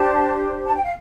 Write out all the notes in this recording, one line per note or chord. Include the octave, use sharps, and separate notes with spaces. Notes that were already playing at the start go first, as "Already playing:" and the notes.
Already playing: D4 G4 C5 A5
A5
G5
F5